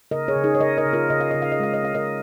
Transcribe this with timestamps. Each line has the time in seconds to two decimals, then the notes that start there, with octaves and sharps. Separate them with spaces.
0.11 C#3 A#4 D#5
0.28 G#4 C#5
0.36 C#3
0.44 D#4 G#4
0.55 C#5
0.60 C#3 A#4 D#5
0.78 A#4 D#5
0.86 C#3
0.93 F4 A#4
1.10 C#3 D#5
1.21 F5
1.31 C#3 D#5
1.42 F5
1.52 D#5
1.60 G#3 F5
1.74 D#5
1.83 C#4 F5
1.94 A#4 D#5